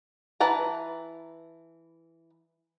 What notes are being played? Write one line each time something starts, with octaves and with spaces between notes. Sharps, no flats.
E3 B4 A5 A#5